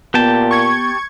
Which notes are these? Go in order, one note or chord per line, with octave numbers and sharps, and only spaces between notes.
A#2 B3 G4 G5 A5
C#6 G#6